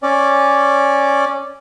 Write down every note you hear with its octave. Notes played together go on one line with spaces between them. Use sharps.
C#4 D5